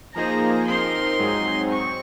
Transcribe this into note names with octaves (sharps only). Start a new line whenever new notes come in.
F3 A#3 D#4 G#4 C5 A#5
F3 C4 D#4 A#4 C6
G#2 F#3 C4 D#4 G#4
C4 C#6